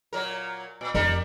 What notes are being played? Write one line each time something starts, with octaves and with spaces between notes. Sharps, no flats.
A#2 F#3 A#4
A#2
F2 G3 D4 A#4